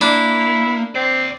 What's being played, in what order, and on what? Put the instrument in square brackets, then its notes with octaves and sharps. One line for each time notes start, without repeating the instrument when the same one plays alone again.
[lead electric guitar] A#3 [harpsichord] D4 [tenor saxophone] E4
[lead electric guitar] D#2 D5 [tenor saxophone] C4